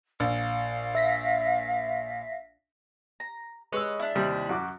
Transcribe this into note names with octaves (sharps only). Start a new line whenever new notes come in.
A#1 F5
E5 A#6 B6
A#5
G#3 B4 C#5 D#5 E6
D4 E4
D#2 C3 G3
F#2 F#4 D6